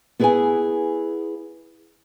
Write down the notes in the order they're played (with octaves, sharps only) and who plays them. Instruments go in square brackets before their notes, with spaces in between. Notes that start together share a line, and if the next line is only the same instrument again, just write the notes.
[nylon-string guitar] B3 E4 G#4 B4 F#5 G#5